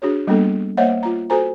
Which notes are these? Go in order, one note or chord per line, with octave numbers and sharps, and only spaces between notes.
D4 F#4 G#4 C#5
G3 A#3 B3 D4 A4
A#3 C5 C#5 D#5 E5 F#5
F4 A#5
F#4 A4 C5 G#5 A#5